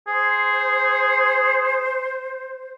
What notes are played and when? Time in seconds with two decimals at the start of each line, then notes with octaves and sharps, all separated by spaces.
0.08 G#4 C5